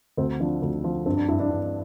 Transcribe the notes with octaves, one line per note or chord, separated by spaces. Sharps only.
D2 C4
F3 D4
D2
F3
G2 C4
D4
G2 E4
D4
G2